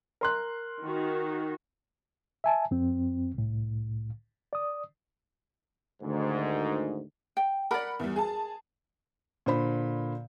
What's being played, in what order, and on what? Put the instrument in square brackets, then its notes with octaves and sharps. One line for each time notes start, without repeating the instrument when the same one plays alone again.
[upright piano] A#4 C6 F#6
[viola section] D#3 F#4
[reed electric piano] E5 G#5 A5
F2 C4
C2 A2
D5 D#6
[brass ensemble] D2 G#2 D#3
[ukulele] G5
[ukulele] A#4 D5 [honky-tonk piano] F#5 B5
[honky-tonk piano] E2 G3
G#4 A5
[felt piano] A#2 D3 C5 B5